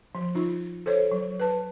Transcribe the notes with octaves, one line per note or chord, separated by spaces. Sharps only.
F3
D#4 F4
A4 C5 C#5
F#3
B4 A5